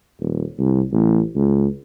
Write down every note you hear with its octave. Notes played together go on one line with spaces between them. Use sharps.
D#1
C2
A1
C#2